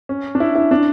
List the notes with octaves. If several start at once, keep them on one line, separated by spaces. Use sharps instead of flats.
C#4
D4
E4
E4
D4